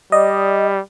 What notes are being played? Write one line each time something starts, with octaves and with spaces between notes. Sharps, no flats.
G3 D5 D#5